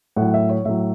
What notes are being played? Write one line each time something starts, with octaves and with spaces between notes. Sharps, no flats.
A2 F#3 F#5
E5
C#5
A2 F#3 E5